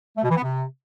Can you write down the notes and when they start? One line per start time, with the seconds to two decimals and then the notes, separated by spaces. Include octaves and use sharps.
0.17 A3
0.23 B2
0.30 E3
0.37 B3
0.43 C3